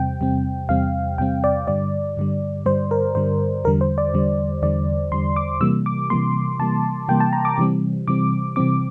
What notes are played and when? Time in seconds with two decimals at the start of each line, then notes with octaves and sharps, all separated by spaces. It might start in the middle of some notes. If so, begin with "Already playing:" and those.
Already playing: E2 C3 G3 C4 G5
0.21 E2 C3 G3 C4
0.69 E2 C3 G3 C4 F5
1.18 E2 C3 G3 C4 G5
1.44 D5
1.68 G2 D3 G3 D5
2.17 G2 D3 G3
2.66 G2 D3 G3 C5
2.91 A#4
3.15 G2 D3 G3 C5
3.65 E2 D3 G3 A#4
3.81 C5
3.98 D5
4.14 E2 D3 G3
4.62 E2 D3 G3 D5
5.12 E2 D3 G3 C6
5.36 D6
5.61 C3 E3 G3 A#3 E6
5.86 D6
6.10 C3 E3 G3 A#3 C6
6.59 C3 E3 G3 A#3 A5
7.08 C3 E3 G3 A#3 G5
7.20 A5
7.33 A#5
7.45 D6
7.58 C3 E3 G3 C4
8.08 C3 E3 G3 C4 D6
8.56 C3 E3 G3 C4 D6